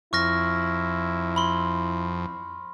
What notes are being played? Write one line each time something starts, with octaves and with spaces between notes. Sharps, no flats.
F2 E4 C#6 F6 A#6
B5 C6